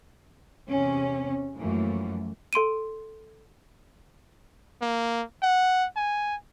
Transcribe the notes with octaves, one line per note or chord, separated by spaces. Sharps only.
E2 C3 C#4
F#2 E3 F3 A3 A#3
A4 C6 D7 D#7
A#3
F#5
G#5